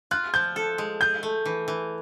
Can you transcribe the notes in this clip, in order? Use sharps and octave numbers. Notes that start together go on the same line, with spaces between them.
F4 F#6
F3 G6
A4
G#3
G#4 G6
A3
E3
E3